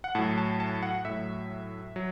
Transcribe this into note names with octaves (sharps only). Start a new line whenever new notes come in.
F#5
A2 F#3 A5
A5
A5
F#5
A2 F#3 E5
F#3